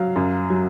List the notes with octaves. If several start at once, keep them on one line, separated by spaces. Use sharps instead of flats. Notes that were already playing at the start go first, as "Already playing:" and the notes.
Already playing: F#3 F5
F#2
F#3